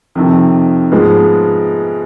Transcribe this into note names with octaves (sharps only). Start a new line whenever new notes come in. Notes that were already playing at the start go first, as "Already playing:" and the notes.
F2 C3 D#3
G#2 F3 G#3 B3